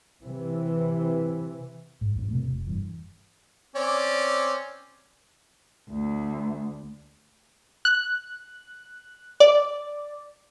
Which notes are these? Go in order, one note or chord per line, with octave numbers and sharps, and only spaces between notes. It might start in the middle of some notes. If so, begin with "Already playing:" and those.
C3 E3
G#2
E2 G#2
C3 A3
F1
G2 E3
C4 C#4 D5
D2
F#6
D5